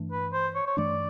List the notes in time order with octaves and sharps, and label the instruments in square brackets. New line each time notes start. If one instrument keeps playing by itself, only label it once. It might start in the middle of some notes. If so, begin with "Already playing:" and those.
Already playing: [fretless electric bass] G2 E3 A3 D4
[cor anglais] B4
C5
C#5
C#5
[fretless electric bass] G2 E3 A3 D4 [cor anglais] D5